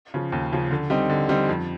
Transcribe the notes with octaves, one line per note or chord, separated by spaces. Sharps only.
C#3 F3
D#2
C#3 F3
D3
G3 C4 D#4
D3
G3 C4 D#4
F2